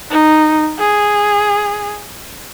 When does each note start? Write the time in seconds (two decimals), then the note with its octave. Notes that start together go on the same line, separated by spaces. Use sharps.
0.11 D#4
0.79 G#4